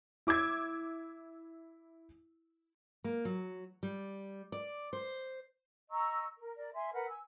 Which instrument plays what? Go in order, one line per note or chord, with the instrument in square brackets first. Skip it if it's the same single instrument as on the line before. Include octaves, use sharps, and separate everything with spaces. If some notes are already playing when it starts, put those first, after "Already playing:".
[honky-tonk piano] E4 D6 E6 G#6
[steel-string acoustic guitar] A#3
F#3
G3
D5
C5
[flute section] D#5 A#5 C#6 E6
A#4
A#4 D5
E5 G#5 C6
A#4 B4 F#5
G#5 E6